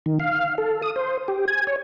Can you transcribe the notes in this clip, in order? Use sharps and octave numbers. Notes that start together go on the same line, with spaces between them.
D#3
F5
A4
D#6
C5
G4
G#5
C#5